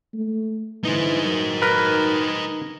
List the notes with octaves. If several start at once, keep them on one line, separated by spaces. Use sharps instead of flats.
A3
D3 E3 D#4 C5
D#3 F#3
A#4 B4